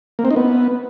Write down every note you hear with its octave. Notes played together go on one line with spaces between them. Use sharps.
A#3
C4
D#4
B3